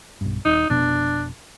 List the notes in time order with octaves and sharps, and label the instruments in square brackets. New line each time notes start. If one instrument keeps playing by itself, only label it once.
[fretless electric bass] B1 G2
[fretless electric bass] D#1 [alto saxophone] D#4
[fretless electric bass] F1 B2 [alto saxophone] D4